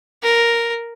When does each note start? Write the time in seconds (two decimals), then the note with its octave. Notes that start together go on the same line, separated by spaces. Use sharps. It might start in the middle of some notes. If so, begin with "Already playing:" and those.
0.23 A#4